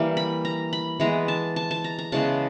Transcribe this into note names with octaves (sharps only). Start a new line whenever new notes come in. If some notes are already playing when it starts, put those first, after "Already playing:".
Already playing: E3 G3 A#3
B5
A#5
B5
E3 G#3 B3 A#5
A5
A5
A5
A#5
A#5
C#3 E3 G#3 B3 A5